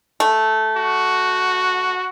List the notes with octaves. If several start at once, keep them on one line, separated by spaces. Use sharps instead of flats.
A3
F#4